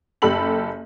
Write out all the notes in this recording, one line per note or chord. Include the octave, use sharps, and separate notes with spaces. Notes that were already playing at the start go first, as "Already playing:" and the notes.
F#1 G4 A4 B5 F#7